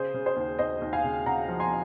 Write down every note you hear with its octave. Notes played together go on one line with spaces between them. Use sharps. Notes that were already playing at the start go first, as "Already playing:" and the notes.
Already playing: C#3 G#4 C5
C#3
G#4 C5
D#2
D#2 C5 D#5
D#2
F5 G#5
C#3
C#3 F#5 A#5
F3
G#5 C6